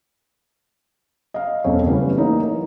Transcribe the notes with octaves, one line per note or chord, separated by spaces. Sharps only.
D#5 F5
E1 B1 F#2 C4 A4 C#5
C#3 E3 G3 A3 B3 C#4
E3 A#3 D#4
B3